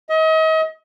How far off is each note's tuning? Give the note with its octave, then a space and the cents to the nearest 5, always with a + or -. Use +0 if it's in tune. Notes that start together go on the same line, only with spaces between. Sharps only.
D#5 +40